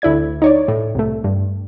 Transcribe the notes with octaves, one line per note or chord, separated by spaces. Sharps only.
D2 E4 D5 G#6
D#4 C#5 D5
A2
C2 A3
G2